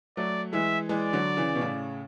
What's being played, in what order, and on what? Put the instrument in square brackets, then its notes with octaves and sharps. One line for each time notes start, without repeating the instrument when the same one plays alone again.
[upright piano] F#3 A3 [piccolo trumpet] D5
[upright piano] E3 G#3 [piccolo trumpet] E5
[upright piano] E3 G#3 [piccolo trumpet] D5
[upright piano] D3 F#3
C#3 E3
B2
A2 C#3